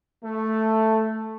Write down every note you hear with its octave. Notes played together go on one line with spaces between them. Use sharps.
A3